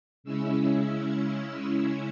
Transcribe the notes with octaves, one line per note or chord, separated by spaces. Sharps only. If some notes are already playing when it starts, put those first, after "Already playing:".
C#3 G#3 C#4 E4 E6